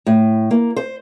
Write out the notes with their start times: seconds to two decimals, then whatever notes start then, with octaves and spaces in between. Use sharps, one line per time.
0.06 A2
0.51 A#3
0.76 C5